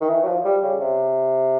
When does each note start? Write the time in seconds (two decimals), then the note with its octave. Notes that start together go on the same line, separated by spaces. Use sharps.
0.01 D#3
0.09 E3
0.23 F#3
0.27 F3
0.45 G3
0.63 C#3
0.81 C3